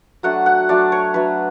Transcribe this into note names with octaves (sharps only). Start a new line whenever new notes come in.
F#3 A3 D4 F#5
F#5
F#3 A3 D4 D5
C#5
F#3 A3 D4 B4